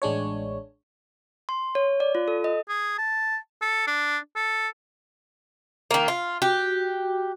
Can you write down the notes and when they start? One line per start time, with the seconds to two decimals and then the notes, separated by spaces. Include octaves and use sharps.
0.02 A1 G#3 D4 C#5
1.49 C6
1.75 C#5
2.00 D5
2.15 F4
2.28 A4
2.44 D#5
2.69 G#4
2.99 A5
3.62 A4
3.87 D4
4.36 A4
5.91 D#3 A#3
6.08 F4
6.42 F#4 G4